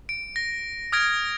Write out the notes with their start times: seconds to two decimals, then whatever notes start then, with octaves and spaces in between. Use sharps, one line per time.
0.09 D7
0.36 A#6
0.92 D#6 F6 G#6 A#6 D7